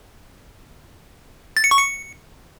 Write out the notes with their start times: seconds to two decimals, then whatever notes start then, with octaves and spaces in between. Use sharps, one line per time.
1.57 A6
1.64 C#7
1.71 C#6
1.79 C#7